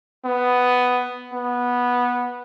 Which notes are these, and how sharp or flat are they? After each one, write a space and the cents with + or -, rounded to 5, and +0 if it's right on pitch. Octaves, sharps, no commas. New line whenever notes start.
B3 +10
B3 -10